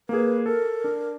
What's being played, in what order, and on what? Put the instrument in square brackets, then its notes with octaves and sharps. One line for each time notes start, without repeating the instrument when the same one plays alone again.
[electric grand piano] A#3 G#4 [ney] B4
[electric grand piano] A4 [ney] A#4
[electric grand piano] D4